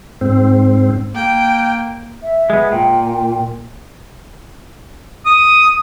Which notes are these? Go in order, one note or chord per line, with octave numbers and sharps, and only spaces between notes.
G#2 C4
A#3 G5
E5
G#3 B3
A#2 G5
D#6